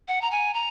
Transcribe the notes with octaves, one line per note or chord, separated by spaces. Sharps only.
F#5
A#5
G#5
A#5